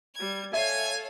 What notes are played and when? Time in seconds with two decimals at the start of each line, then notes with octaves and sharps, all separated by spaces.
0.13 G3 G#6
0.53 A4 C#5 E5 F5 G#5 C7